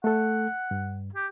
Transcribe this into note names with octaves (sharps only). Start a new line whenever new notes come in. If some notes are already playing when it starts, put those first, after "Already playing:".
A3 A4 F#5
G2
G4